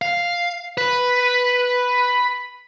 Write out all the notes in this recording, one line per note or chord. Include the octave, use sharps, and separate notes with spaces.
F5
B4